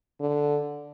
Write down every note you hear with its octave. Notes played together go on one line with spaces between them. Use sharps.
D3